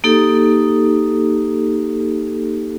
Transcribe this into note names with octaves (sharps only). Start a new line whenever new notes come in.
A#3 D#4 G4 A4